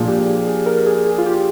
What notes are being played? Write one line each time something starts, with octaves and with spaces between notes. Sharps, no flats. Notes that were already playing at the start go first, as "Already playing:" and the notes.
Already playing: A#2 F3 G#3 D4 G#4
G4
G4
G#4
A#4
G#4
G#4
F4
G4